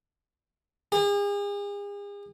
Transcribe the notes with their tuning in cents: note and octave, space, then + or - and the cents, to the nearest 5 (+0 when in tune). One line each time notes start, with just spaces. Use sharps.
G#4 -40